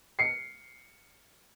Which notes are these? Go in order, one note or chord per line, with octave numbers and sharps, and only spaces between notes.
C7 C#7